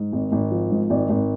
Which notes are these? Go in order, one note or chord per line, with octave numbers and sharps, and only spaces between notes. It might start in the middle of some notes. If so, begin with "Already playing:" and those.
Already playing: G#2
G#1
G#1
F3
G#2
G#1 D5
G#1